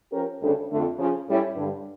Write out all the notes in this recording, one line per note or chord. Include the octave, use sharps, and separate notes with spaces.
F3 C#4 G4 A#4
D2 C#3 G3 D4 A4
F2 D3 A3
C#3 F3 C#4
A2 G3 C#4 E4
G2 D3 G3